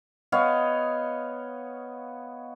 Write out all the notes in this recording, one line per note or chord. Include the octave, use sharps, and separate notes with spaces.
B3 C#5 D#5 F5